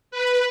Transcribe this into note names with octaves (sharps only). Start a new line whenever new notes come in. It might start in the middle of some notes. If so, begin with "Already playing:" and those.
B4